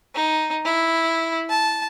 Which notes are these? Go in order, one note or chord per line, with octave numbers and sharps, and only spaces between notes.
D#4
E4
A5